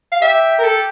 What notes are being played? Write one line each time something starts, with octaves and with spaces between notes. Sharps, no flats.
F5
G4 E5
A#4
A4